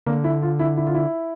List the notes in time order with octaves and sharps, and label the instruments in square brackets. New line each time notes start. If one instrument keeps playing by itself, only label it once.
[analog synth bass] D3 [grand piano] A#3
[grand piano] E4
F4
E4
E4
F4
E4